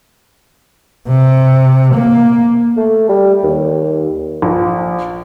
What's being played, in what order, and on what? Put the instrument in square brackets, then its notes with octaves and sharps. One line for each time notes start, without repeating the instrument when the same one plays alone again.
[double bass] C3
A#3
[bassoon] A3
G3
D#2
[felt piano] A#1